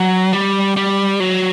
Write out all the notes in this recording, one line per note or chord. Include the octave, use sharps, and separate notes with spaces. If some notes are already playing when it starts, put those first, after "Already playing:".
Already playing: F#3
G3
G3
F#3